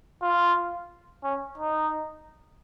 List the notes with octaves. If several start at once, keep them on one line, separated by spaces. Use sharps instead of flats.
F4
C#4
D#4